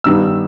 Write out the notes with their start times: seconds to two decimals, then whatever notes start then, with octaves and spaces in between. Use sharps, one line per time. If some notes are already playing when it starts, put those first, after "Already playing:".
0.04 G2 D#3 G3 B3 D#4 E6